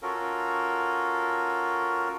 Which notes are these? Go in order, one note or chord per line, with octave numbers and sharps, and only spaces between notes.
C#4 F4 F#4 A4 A#4